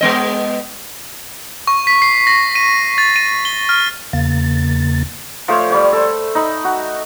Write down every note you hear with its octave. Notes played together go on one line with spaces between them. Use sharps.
G#3 B3 D#5
C#6
B6
C7
A#6
D#7
A6
D#7
G7
F6
E2 C#3 A#3 A6
F3 A3 C5 C#5
G3 C#5 G5
A4 C5
D#4 B5
F#4